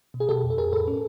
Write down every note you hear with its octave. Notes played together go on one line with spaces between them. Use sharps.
B2
G#4
B2 G4 A4
F2
A4
F2 G#4 A#4
A2 A4 B4
C#4